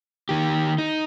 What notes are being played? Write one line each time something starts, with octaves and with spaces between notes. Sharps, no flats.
D#3 G4
D#4